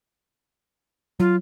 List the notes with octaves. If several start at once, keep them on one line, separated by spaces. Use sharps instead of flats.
F#3 F4